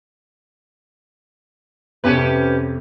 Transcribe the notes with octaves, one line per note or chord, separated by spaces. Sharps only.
F2 C3 C#4 G4 B4